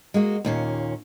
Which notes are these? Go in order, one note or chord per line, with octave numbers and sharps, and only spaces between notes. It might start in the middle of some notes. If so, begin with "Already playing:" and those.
G#3 A#3 F#4
D#2 A#2 C#4